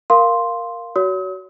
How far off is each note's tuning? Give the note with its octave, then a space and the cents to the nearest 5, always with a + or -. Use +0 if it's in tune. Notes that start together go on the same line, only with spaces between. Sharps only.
A#4 +0 F5 +0 C6 +0
F#4 +20 C#5 +30 D#6 +45